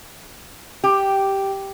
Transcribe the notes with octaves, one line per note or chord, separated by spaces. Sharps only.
G4